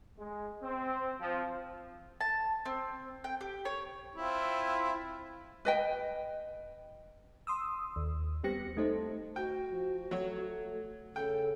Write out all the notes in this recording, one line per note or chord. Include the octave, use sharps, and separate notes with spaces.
G#3
C4
F3
A5
C4
G5
G4
C#5
C4 E4 F4
B4 D#5 G5
C6 D#6 E6
D#2
G3 B3 C4 G4 A#6 C#7
A3 D#4 A4 C5
F#4 G5
F3
F#3 A3 C#5
C#3 A4 G5